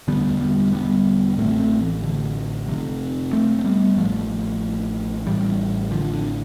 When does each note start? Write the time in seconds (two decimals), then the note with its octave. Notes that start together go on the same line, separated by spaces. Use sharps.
0.08 E1 D2 D3 G3 B3
0.41 G3 B3
0.73 G3 B3
1.38 A1 A2 A3 C4
1.60 A3 C4
1.81 E3
2.03 D3
2.67 F1 F2 C3
3.33 A3 C4
3.59 C4
3.64 G3 B3
3.97 A1 A2 F3 A3
5.27 A1 A2 E3 G3
5.91 D3 F3
6.13 D3